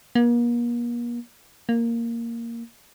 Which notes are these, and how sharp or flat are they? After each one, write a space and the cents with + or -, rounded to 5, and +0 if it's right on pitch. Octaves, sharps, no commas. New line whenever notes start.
A#3 +40
A#3 -5